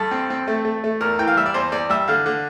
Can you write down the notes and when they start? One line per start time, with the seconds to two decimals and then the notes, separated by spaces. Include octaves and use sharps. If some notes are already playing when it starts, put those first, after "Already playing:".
Already playing: G2 A4
0.11 C4
0.30 C4
0.48 A3
0.65 A3
0.84 A3
1.01 E2 A#4
1.19 E3 G5
1.27 F5
1.37 G3 E5
1.46 D5
1.54 E2 C5
1.72 E2 D5
1.90 G3 E5
2.08 D3 F5
2.26 D3